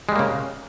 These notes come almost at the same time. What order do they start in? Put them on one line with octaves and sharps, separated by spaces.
G#3 G3 A#3 C#3